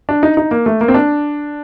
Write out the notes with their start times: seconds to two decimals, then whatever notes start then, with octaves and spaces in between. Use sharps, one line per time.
0.09 D4
0.23 D#4
0.37 D#4
0.51 A#3
0.66 A3
0.81 A#3
0.88 C4
0.94 D4